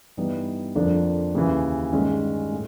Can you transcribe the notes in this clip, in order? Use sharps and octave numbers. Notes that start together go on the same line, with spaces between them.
G2 E3 G3 B3 D#4
F2 D3 F3 A#3 D4
D#2 C#3 E3
G2 D#3 G#3 C#4
A2